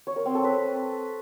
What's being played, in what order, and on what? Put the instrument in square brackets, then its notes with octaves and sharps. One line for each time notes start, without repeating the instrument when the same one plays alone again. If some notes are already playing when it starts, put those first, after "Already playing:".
[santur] C#5
A#4
C4
A4
B4